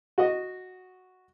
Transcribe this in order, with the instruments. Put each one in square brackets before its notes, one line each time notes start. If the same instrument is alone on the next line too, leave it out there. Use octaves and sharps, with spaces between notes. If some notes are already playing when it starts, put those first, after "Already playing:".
[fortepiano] F#4 D#5